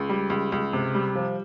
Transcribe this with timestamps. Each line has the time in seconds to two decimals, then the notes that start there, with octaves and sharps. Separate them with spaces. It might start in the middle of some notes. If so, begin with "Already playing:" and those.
Already playing: C#2
0.09 G3
0.30 C#2
0.52 C#2
0.73 C3
0.95 G3
1.15 F3